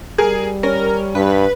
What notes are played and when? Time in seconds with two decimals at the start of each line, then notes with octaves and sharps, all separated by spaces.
0.18 G3 G#4 A#4
0.63 C#4 A#4
1.15 G2 B4